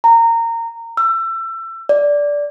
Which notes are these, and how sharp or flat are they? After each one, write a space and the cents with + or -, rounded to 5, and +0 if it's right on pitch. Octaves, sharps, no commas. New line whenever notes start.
A#5 -20
E6 +25
D5 -10